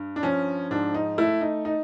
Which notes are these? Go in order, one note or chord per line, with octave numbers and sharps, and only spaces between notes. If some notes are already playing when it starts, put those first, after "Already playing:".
Already playing: G2
D4
F3 C#4
G#2 D4
D#4
A3 E4
D#4
D#4